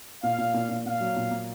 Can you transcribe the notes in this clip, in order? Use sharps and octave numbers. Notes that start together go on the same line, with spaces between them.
A#2 F5
A#2
A#2
A#2
A#2 F5
F#3
A#2
A#3